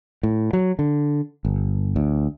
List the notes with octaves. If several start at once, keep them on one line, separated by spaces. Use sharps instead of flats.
A2
F#3
D3
G1
D2